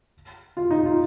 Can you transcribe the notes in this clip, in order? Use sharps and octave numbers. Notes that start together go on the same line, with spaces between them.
F4
D#4
F4